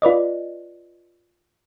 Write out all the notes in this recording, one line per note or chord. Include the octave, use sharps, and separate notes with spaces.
F4 B4 D5 D#5